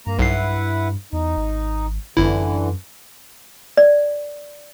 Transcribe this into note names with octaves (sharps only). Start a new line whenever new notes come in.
G2 A#3 A#5
B1 E4 B4 F#5 C7
E2 D#4
G#1
G1 F#2 D3 E3 E4
D5